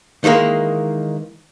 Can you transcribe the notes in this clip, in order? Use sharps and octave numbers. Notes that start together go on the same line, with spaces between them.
D#3 E3 G#3 A#3